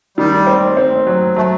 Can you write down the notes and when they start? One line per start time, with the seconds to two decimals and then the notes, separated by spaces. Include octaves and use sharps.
0.18 D#3 G3
0.47 C4
0.77 C4
1.07 F#3
1.36 F#3 A3